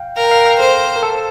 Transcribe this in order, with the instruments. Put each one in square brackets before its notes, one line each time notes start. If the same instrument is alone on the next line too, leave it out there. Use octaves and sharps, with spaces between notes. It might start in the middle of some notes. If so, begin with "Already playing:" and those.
Already playing: [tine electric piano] F5 G5
[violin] A#4 [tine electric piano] F5
[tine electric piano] G5
F5
G5
F5
[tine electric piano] A4 [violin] C5
[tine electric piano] A#4
A4